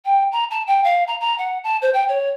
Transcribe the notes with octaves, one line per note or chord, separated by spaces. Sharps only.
G5
A#5
A5
G5
F5
A#5
A#5
F#5
A5
C5
G5
C#5